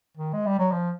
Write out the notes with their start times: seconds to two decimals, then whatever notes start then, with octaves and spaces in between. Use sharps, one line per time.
0.17 D#3
0.33 G#3
0.46 G3
0.59 F#3
0.72 F3